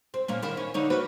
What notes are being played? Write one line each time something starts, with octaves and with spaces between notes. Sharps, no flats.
C4
A#2 A#3 C#4
D#3 A#3 E4
C#4
D3 D#4 C#5
A#3 F#4 B4